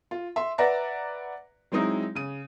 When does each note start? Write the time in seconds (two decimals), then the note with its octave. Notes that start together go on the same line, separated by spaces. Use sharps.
0.11 F4
0.36 E5 C6
0.58 B4 D5 E5 F#5 A#5 A#6
1.72 F#3 G#3 C4 D#4 E4
2.15 C#3 D#7